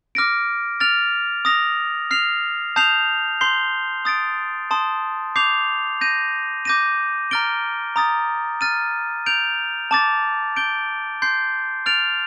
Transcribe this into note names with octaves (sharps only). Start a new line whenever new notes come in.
D6 F6 A#6 D7
F6 A6 D7 F7
D#6 A#6 F7
F6 C7 F7
A5 D#6 G6 C7 F7
C6 G6 C7 G7
D#6 A6 D7
A5 C6 D#6
D6 G6 C7 F7
G6 A#6 D#7
D6 G6 A#6 D#7
A#5 F6 A6 D7 G7
A#5 D#6 A6
F6 A6 D#7
G6 D7 F7
A5 D6 A6
G6 D7 G7
C6 G6 C7
F6 A6 D7 F7